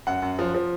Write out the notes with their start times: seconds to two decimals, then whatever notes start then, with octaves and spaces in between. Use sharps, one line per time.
0.07 F#2 F#5
0.22 F#2
0.39 F3
0.54 F3